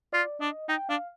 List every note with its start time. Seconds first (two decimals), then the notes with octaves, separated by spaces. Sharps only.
0.13 F4 D5
0.40 D4 D#5
0.68 D#4 G5
0.89 D4 F5